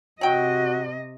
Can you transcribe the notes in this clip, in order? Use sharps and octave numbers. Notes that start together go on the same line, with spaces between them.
C3 F#3 F#4 D#5 G5